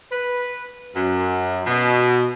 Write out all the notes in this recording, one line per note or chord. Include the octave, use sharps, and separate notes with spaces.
B4
F#2
B2